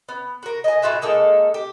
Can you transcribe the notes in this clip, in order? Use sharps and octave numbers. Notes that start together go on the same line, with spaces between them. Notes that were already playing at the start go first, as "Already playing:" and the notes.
B3
F#4 A#4
D#5 G#5
A2 F4 F#4 E5
G#3 A#3 D#4 A4
G4